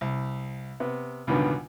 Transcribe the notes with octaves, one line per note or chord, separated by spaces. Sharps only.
C2
C3 B3
C#2 G2 B2 D3 D#3 B3